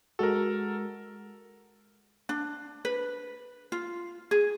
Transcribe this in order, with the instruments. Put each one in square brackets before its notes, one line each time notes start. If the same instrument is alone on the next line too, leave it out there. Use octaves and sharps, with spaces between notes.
[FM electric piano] G#3 F#4 [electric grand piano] A4 A#4
[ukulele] D4
B4
F4
G#4